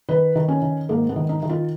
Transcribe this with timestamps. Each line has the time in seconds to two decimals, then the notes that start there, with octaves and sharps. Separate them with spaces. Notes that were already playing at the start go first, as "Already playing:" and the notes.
0.09 D#3 B4
0.35 D#3
0.48 C#4
0.62 D#3
0.89 G#2 A#3
1.09 B3
1.16 D#3
1.29 D#4
1.43 D#3
1.49 F4